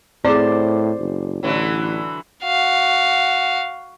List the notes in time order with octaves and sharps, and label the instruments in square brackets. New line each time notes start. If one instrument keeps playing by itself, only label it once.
[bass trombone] A2 [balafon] C4 G#4 [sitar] C5 [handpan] D5
[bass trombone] F#1
[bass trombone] A1 [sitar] D3 E3 F#3
[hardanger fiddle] F#4 F5